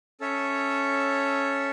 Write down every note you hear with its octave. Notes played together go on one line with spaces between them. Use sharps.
C#4 A4 C#5 E5